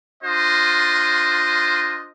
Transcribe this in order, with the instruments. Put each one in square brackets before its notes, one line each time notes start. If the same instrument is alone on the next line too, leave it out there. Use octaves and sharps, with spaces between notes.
[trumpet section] D4 F4 C5 D#5